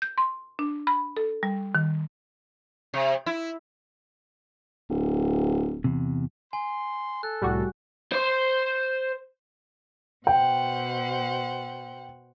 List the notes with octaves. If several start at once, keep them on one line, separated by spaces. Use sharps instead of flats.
G6
C6
D4
B5
A4
G3
D#3
C3
E4
D1
E2 C3
G#5 C6
A4 F#6
C2 A2 G3 F#4
C5 C6
B2 C5 F#5 G5